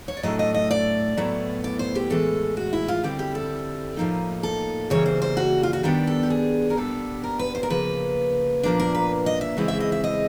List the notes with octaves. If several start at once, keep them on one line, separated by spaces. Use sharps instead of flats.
C#5
D5
A2 F#3 A3 D4 D#5
D#5
D#5
D5
A2 F#3 B3 E4
D5
C5
G4
A2 E3 G#3 A4
F#4
E4
F4
D3 G3 C4 E4 G4
G4
A4
A2 F3 A#3 D#4
A4
C#3 E3 G3 A#3 C#5
C5
C5
F#4
F4
F#4
D#3 G3 B3 D4 G4
A4
G4
G#4
A#4
A#2 G3 B3 D4 A4
A#4
B4
C5
A#4
C#3 F3 A#3 B4
A#2 F3 A#3 D4
A#4
B4
D#5
E5
C#3 E3 G#3 C4 E4 D#5
E5
D#5
E5
D#5